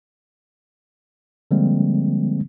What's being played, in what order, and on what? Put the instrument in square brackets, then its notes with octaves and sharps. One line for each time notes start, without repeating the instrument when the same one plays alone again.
[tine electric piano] D3 F3 G3 G#3 A#3 C4